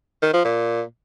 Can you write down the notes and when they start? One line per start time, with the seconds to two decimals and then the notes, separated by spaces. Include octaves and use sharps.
0.22 D#3
0.33 F3
0.45 A#2